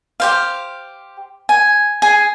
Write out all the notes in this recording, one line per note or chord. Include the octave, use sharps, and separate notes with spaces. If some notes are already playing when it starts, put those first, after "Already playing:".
G4 C5 F5
G#5
G#4 G#5